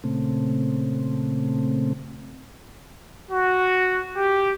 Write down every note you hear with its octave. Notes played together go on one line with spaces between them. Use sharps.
A#2 C#3 A3 C4
F#4
G4